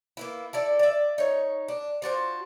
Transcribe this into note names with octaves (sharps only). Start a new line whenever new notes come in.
A#3 B3 E4
E4 A4 D5
D5 E5
D#4 C#5
D4
D4 F4 F#4 C5